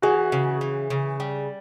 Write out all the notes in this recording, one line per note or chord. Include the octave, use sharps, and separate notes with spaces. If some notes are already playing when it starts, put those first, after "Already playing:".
E3 F#4 G#4
C#3
E3
C#3
G3